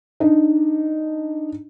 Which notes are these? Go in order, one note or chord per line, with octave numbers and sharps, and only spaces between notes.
D4 D#4